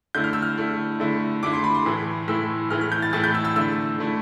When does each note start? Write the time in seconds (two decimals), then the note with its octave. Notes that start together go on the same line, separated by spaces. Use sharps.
0.15 D3 A3 E4 G6
0.24 F6
0.33 E6
0.42 F6
0.58 D3 A3 E4
1.00 D3 A3 E4
1.43 D3 A3 E4 D6
1.53 C6
1.64 B5
1.75 C6
1.86 A2 E3 A3 E4
2.28 A2 E3 A3 E4 E6
2.70 A2 E3 A3 E4 F6
2.81 F6
2.92 G6
3.02 A6
3.13 A2 E3 A3 E4 A6
3.24 G6
3.34 E6
3.45 E6
3.56 D3 A3 E4 E6
3.98 D3 A3 E4